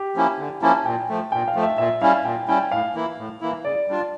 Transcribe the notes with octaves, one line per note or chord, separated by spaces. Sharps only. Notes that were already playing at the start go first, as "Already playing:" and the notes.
Already playing: G4
F3 A#3 C#4 E4
D3
F3 A#3 C#4 E4 A5
A#2 G5
F3 A3
A#2 G5
F5
F3 A3
E5
A#2 E5
G3 C#4 E4 F5
A#2 G5
G3 C#4 E4 G5
A2 F5
E3 A#3 E4
A2
E3 A#3 E4
C#3 D5
G3 D4 F4